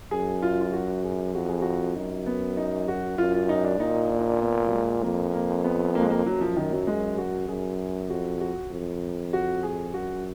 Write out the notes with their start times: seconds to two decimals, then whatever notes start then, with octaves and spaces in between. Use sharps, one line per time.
0.11 F#2 G#4
0.42 F4
0.61 F4
0.73 F#4
1.04 G#4
1.35 F2 F#4
1.49 G#4
1.62 F#4
1.96 F#2 D#4
2.26 B3
2.57 D#4
2.88 F#4
3.18 F#2 F4
3.34 F4
3.49 D#4
3.64 D4
3.79 A#2 D#4
4.11 D4
4.19 D#4
4.27 D4
4.41 B3
4.67 F#3
4.72 G#3
5.03 F2 A#3
5.34 A#3
5.64 B3
5.95 A#3
6.02 G#3
6.10 A#3
6.26 F#2 F#3
6.41 F3
6.57 D#3
6.72 F#3
6.87 G#3
7.18 F#4
7.48 F#2 G#4
8.09 F2 F#4
8.41 F#4
8.71 F2
9.33 F#4
9.63 G#4
9.94 F#2 F#4